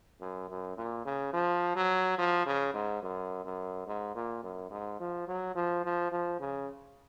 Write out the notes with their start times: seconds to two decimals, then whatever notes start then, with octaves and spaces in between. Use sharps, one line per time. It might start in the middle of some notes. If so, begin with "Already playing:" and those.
0.21 F#2
0.49 F#2
0.77 A#2
1.05 C#3
1.33 F3
1.76 F#3
2.18 F3
2.46 C#3
2.74 G#2
3.03 F#2
3.45 F#2
3.87 G#2
4.15 A#2
4.43 F#2
4.71 G#2
5.00 F3
5.28 F#3
5.55 F3
5.84 F3
6.12 F3
6.40 C#3